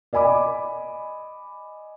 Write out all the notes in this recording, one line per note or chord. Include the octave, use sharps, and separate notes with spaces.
D5 D#5 G#5 B5 D6